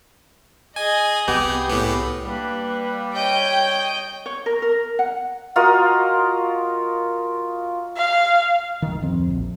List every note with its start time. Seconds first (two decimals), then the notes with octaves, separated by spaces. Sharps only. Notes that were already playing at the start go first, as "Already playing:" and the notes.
0.76 G#4 D#5 G#5
1.28 C2 B3 G4
1.68 A2 B3
2.24 G3 A#3 D4 B4
3.15 C#5 D#5 G5 G6
4.26 C#5
4.46 A#4
4.62 A#4
4.99 F#5
5.56 F4 F#4 A#4 D#5
7.97 F5
8.82 D2 D#3
9.01 D1 F2 C4
9.30 A#1